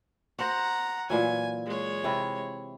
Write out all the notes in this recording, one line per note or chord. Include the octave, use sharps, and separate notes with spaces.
F#4 C5 F#5 A#5
A#2 E3 F#3 G#5
G#3 C#5
C3 E4